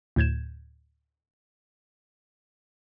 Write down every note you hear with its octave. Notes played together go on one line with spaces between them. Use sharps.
D2 A2 G6 G#6 E7